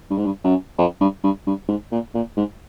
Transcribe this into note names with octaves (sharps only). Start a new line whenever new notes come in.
G2
G#2
G2
F#2
F2
G2
G2
G2
G#2
A#2
A#2
G#2